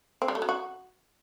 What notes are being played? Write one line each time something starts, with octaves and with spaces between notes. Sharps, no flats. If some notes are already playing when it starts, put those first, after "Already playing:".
C4
G3
A3
F#3
F#4